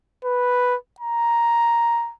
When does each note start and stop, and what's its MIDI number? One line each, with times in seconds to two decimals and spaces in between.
0.24 0.76 71
1.00 2.13 82